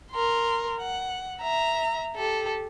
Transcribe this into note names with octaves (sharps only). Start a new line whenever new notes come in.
A#4 C6
F#5
E5 A#5
G4 A4